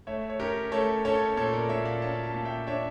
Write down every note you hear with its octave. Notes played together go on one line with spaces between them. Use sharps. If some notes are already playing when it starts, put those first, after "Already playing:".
A3 C#5 E5
C#5
C#4 G4 A#4
A3 A4 C#5
C#4 A4 C#5
A#2 A4 C#5
A#4 D5
A#2 C#5 E5
D5 F5
C#4 F5 A5
F5 A5
A#2
E5 G5
D4 C#5 E5